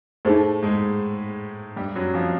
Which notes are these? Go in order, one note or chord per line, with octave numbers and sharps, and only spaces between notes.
A2 A3 D#4 G#4 C5
G#2 G#3
G2 G3
F#2 F#3
F2 F3